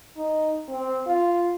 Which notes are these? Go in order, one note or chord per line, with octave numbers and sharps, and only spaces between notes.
D#4
C4
F4